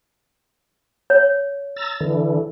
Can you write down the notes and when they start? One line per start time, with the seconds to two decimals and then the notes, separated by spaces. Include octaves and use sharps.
1.10 C#5
1.76 A#5 E6 A6
2.00 D3 E3